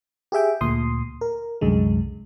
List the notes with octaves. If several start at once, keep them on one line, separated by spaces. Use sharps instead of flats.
G4 G#4 E5 G5
D2 A#2 C6 D#6
A#4
C2 F#2 D3 G#3